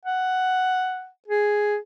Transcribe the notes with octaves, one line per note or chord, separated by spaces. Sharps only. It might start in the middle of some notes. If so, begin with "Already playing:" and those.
F#5
G#4